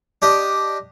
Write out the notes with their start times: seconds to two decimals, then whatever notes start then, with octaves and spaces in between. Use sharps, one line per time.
0.22 D4 G4 D#5